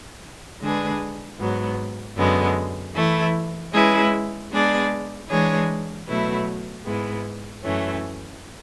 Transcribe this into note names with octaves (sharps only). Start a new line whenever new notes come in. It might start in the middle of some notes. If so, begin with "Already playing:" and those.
D3 G#3 D4 G#4 B4
G#2 F#3 B3
F#2 D3 G#3 B3
E3 A3 E4
G#3 C#4 E4 G#4 B4
G#3 B3 D4 G#4 D5
E3 G#3 D4 G#4 C#5
B2 F#3 A3 E4 B4
G#2 G#3 B3 E4
F#2 E3 A3 C#4